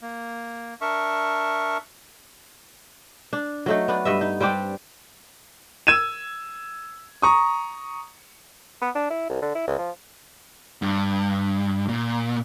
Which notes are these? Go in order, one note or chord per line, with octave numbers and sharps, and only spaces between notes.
A#3
D4 A#4 E5 C#6
D4
F#3 A3 D#4
B3 D4
G2 D#5 E5
D#4
G3 C4 D4 G4
E6 G#6 D#7 E7
A#5 C#6 D#6
B3
D4
E4
C2
D3
E4
C#2
F3
G2
A#2